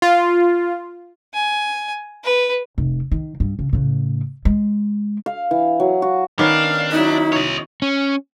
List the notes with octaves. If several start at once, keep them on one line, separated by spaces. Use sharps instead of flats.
F4
G#5
B4
F1
D#3
G2
C#3
A2 C#3
G#3
F5
E3
F#3
F#4
D#3 B3 C#4 D4 F5
F#3 D#4 E4
C#5 D#5
C#4